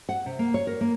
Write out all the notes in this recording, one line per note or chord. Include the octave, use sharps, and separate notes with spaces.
F#5
C3
A#3
C#5
A#4
A#3